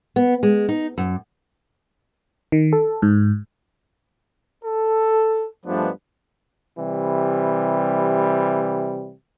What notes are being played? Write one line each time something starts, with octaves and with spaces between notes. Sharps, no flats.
B3
G#3
D#4
F#2
D#3
A4
G#2
A4
G2 F3 G#3 A3 B3 D4
C3 E3 G3